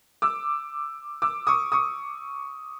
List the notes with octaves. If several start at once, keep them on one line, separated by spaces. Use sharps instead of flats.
D6 E6
D6 E6
C#6 D#6
C#6 D#6